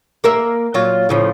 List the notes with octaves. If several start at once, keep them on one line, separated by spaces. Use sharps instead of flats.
A#3 A#4 E5
A#2 F#3 F4
A2 C#3 F3